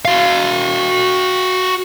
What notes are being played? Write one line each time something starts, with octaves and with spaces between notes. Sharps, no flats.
F#4 F5